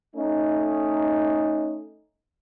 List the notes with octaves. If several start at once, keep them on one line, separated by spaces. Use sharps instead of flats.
A3 C#4 D#4